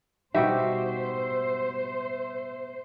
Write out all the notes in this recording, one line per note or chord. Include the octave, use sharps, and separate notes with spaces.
B2 G3 D#4 F#4 G4 C5 E5